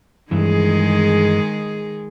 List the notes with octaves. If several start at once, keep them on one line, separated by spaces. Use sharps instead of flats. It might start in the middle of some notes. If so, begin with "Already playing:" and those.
G2 D#3 E3 G#3 G#4